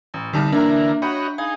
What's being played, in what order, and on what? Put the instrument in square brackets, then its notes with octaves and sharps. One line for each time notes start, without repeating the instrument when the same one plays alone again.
[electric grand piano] A1
[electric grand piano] C2 G3 D#4 [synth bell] D3 A5 F6
[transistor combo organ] D3 E3 A#4 [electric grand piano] A#3 [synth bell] D4 E5 A#5
[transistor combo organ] F#4 C#5 D#5 [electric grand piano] F#5 G5 B5
[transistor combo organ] D#4 G#4 [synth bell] F5